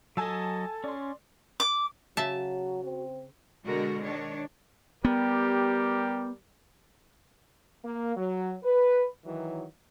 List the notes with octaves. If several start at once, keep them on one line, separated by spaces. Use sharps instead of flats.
F#3 A4 D#5 G#5 A5 E6
C#4 D5 C6
D6
C#3 F#3 F#4 E5 A5
C4
B2 D3 G#3 F#4 A#4
D#3 D4 C#5
G3 B3 G4 A#4
A#3
F#3
B4
D#3 E3 F#3